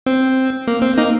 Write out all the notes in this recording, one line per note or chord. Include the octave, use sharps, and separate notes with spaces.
C4
A#3
C4
A#3 D#4